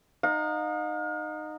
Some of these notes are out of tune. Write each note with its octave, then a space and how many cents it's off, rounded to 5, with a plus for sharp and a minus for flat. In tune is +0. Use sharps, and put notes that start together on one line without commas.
D#4 -15 F5 +40